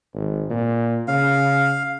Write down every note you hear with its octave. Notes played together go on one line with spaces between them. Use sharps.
G#1
A#2
C#3 F5